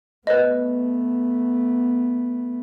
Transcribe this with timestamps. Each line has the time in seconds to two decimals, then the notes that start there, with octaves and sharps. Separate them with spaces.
0.27 A3 B3 B4 C5 D#5